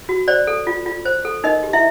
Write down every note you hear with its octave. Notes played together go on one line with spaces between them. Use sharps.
F#4
C5 D5
A4
F4
F4
C5
A4
D#4 A#4 D#5
G4
E4 E5